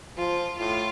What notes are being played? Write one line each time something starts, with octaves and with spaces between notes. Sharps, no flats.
F3 F4
A2 F4